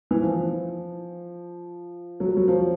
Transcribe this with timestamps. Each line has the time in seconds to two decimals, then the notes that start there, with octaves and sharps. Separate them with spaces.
0.11 E3
0.22 F3
2.20 F#3
2.28 G3
2.37 F#3
2.48 F3